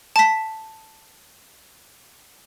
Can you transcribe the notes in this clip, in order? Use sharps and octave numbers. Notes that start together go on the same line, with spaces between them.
A5 B6